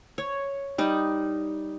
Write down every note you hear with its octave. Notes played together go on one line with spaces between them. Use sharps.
C#5
G3 D#4